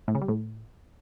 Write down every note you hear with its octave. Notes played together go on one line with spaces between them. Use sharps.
A2
C#3
G3
A2